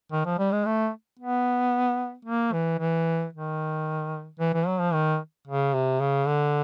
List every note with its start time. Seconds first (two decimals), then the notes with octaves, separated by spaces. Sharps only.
0.12 D#3
0.25 F3
0.39 G3
0.52 G#3
0.65 A3
1.19 B3
2.25 A#3
2.53 E3
2.79 E3
3.33 D#3
4.39 E3
4.53 E3
4.67 F#3
4.80 F3
4.93 D#3
5.47 C#3
5.74 C3
6.00 C#3
6.27 D3